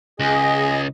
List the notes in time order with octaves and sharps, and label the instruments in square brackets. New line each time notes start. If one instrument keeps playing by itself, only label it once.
[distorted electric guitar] C#2 [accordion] G#4 D#5 [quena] G#5